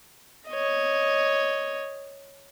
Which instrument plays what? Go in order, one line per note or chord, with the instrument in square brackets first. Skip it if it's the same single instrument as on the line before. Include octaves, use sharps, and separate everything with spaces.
[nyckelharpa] C#5 D#5